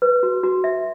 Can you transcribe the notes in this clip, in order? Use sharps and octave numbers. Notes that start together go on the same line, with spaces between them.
B4
F#4
F#4
E5